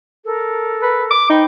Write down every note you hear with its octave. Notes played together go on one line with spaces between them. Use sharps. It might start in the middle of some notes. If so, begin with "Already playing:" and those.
A4 A#4
B4
D6
D#4 C5 G5 B5